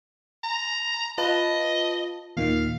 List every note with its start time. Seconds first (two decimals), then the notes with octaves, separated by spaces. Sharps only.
0.44 A#5
1.18 F4 B4 D#5 A5
2.37 D#2 A#2 D#3 F5